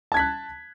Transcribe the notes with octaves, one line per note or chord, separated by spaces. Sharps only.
A5 F#6 G#6 B6